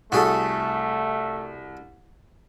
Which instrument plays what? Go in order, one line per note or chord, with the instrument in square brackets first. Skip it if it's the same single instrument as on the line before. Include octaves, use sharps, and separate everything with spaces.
[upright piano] C2 [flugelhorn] A3 [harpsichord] F#4 G#4 A4